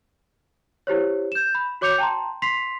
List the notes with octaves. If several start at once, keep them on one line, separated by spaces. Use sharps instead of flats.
E4 G4 C5 C#5
G6 E7
B5
F#4 C#5 D6 G6 C#7 F7
G5 A5 A#5 C6
C6 B6 C7 F7